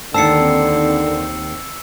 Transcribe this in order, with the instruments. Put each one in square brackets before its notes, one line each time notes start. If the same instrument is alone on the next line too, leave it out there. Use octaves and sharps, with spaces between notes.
[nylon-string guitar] D#2 A5 [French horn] D3 [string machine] D#3 C4 [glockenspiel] E6 C7 C#7